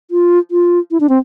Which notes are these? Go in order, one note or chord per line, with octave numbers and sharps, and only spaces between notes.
F4
F4
E4
D4
C4